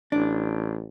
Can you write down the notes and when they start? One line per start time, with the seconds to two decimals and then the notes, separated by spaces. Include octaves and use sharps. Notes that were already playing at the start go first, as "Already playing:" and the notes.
0.12 A1 D4